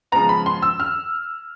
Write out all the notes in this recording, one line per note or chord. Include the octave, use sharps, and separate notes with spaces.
C#3 F3 G#3 B3 A#5
B5
C6
E6
F6